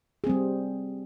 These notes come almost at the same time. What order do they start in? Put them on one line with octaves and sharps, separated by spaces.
G#4 C4 G3